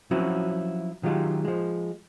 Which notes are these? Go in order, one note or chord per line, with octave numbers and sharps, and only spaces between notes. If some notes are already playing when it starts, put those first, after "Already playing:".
F3 F#3 C4 C#4 E4 F#4
D#3 F#3 G#3 F4 G4
F3 G#3